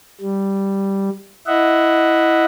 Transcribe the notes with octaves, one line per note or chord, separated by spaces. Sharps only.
G3
E4 D#5 E5 F#5